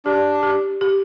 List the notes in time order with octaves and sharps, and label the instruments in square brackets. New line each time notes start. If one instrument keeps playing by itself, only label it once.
[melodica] D4 [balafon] G4
[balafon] G4
G4